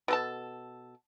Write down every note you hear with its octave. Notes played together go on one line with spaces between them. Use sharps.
B2 A4 A5